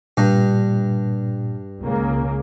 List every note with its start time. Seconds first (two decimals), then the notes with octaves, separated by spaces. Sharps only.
0.17 G2 A#2
1.81 C#2 C#3 A#3